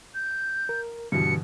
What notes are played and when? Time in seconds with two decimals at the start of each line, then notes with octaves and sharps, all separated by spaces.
0.14 G6
0.69 A#4
1.12 G2 B2 D3 E3 C#7